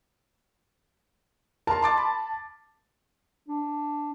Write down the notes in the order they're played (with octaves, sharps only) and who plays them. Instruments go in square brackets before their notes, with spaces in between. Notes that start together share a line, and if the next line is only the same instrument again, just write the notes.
[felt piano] A#4 C6 [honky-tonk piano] A5
[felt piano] C6 D6 A6
B5
[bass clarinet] D4